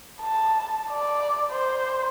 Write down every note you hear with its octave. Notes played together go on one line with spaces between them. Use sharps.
A5
D5
C5